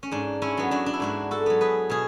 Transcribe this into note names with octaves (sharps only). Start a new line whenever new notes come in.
C#4
G#2 D4
C#4 E4
F#3 B3
D4 F#4
D4
E4
G#2 D4 F#4
F#4 A4
F#3 B3
G#4 B4
B2 G#4